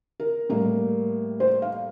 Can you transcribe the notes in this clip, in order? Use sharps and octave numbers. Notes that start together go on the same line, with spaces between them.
A#4
A2 G3 A#3
C5
F5